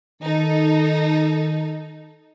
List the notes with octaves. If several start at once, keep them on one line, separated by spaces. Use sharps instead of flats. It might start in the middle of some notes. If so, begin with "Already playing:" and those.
D#3 D#4 A4